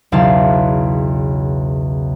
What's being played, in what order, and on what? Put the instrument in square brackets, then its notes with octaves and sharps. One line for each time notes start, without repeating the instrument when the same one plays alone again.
[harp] B1 E2 C#3 F5 A5